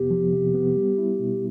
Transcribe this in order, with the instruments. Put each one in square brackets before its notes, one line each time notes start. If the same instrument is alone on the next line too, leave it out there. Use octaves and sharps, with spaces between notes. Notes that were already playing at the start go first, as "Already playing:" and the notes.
Already playing: [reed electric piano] F2 C3 B3 [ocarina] G4
[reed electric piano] F3
C3
B3
G3
E4
B2